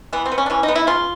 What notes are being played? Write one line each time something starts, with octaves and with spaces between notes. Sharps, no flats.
E3 B3
C4
B3
C#4
D4
E3 C#4
D#4
B3
E4
C#3 F4